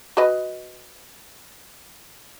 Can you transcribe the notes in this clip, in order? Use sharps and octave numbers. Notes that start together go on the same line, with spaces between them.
F#4 B4 D#5